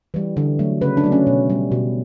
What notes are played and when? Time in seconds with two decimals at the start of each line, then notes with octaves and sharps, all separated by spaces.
0.14 E3 G3
0.37 D3
0.59 F#3 A3
0.81 C#3 B4
0.97 D4
1.04 F#3 A3
1.12 C#4
1.27 B2
1.50 G3
1.72 B2